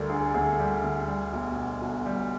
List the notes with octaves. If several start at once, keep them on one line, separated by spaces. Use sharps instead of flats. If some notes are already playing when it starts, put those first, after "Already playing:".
Already playing: D2 G3 A4 A#4
D3 G#4
D2 G#4
G3
D2
G3
B1
B2
B1
G3